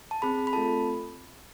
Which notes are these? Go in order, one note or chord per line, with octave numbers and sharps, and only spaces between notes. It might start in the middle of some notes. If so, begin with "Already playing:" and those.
A5
C4 G#4 B5
B5
A3 C4 F4 A4 A5